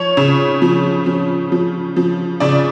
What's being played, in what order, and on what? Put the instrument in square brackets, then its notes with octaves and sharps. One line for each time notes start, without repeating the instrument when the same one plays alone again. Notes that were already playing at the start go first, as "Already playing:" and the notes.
Already playing: [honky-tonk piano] F3 C#5
C#3
F3
F3
F3
F3
C#3 D5